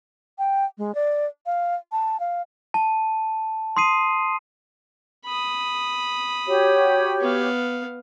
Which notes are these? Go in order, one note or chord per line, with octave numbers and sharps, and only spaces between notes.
G5
G#3
D5
F5
A5
F5
A5
C6 D#6 C7 D#7
B5 D#6
F#4 G4 C#5
B3 F5